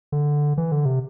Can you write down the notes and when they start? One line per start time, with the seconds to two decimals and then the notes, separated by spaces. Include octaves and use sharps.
0.12 D3
0.58 E3
0.72 D3
0.85 C3